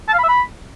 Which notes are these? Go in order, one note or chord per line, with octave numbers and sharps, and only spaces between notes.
A5
F5
B5
E5
B5